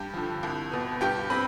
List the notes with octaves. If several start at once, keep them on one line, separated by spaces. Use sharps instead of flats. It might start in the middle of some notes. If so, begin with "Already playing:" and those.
Already playing: G2 G4 G5
D3 F3
C2
B2 B3
G2 G4 G5
C4 B4 B5